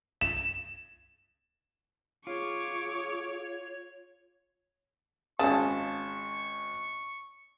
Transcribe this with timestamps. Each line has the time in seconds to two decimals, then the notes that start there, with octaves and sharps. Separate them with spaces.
0.21 E7
2.27 F4 G#4 C#5 C#6 D6
5.39 G#1 C#3 G#4 A5 C#6